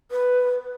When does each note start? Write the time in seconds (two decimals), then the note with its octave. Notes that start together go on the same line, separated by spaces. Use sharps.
0.11 B4